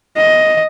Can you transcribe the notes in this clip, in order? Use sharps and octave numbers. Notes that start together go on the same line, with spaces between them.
D#5